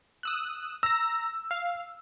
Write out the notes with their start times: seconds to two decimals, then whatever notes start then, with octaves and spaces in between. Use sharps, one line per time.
0.23 D#6 E6 F#6
0.83 A#5 E6 A#6
1.51 F5